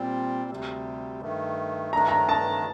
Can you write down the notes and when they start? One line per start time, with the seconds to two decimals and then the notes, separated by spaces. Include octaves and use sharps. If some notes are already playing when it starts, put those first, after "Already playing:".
Already playing: A#2 G3 C4
0.50 D2 C3 G3
1.22 G2 D#3 A3
1.93 G2 D#3 A3 D4 A#5
2.08 A#5
2.29 A5